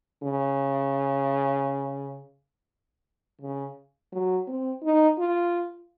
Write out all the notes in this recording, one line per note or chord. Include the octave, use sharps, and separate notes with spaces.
C#3
C#3
F#3
C4
D#4
F4